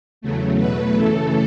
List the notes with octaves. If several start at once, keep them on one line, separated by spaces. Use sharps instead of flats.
E2 C#3 F#3 A3
E2 B2 F#3 A3 B4
F#2 C#3 E3 A3 A4